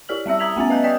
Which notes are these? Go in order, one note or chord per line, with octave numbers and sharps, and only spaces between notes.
E4 G4 D5 F6 F#7
G3 C4 E5 E6
A#5 D#6 G#6 B6 F7 F#7
A3 B3 C#4 E5 G#5 A6
B4 D#5 A5 F#6 G6
D5 G5 D#6 G6 B6